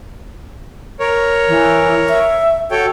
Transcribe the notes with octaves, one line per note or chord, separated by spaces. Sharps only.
A#4 C#5
E3
E5
F#4 A4 C#5 G5